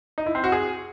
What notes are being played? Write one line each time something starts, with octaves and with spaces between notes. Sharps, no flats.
D#4
E4
C4
F#4
G#4